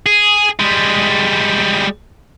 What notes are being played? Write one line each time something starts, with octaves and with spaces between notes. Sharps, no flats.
G#4
G3 G#3